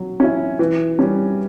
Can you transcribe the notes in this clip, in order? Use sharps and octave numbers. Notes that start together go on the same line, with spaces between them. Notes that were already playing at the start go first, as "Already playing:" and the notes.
Already playing: F#3
C#4 E4
E3
G3 C#4